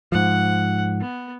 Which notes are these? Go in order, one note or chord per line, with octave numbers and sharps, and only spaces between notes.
G#2 F3 F#5
B3